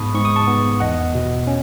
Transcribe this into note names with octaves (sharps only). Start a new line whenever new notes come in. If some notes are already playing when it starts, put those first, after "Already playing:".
Already playing: G#2 B3 A5 B5 C#6 D#6
G#2 C#6
D#6
A5 C#6
B3
E2 D#5 F#5
B2
C#4